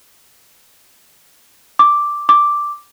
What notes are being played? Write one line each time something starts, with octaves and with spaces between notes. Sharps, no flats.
D6
D6